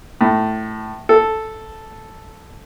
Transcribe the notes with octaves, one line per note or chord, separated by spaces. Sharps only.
A2
A4